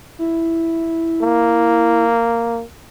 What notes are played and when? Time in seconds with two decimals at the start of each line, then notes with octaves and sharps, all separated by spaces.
0.19 E4
1.21 A#3